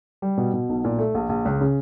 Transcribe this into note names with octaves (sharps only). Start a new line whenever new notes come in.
G3
B2
B2
B1
A#2
A3
A#1
A#1
C#2
C#3